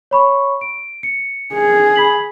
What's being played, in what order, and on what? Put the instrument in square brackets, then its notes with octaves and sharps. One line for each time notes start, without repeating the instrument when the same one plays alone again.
[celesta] C#5 B5 C#6
D7
C#7
[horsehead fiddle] G#4
[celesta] B5 B6 F#7